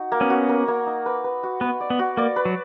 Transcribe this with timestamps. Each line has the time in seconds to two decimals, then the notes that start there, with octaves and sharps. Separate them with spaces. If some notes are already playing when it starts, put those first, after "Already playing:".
Already playing: D#4 F#4
0.12 A#3
0.21 B3 C#4
0.30 F#4
0.49 A#3
0.68 A#3
0.86 D#4
1.06 B4
1.24 B4
1.43 F#4
1.61 B3 B4
1.80 D5
1.90 B3
1.99 F#4
2.17 A#3 D5
2.36 B4
2.45 F#3